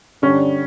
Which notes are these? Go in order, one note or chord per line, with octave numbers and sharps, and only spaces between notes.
G2 D3 G3 C#4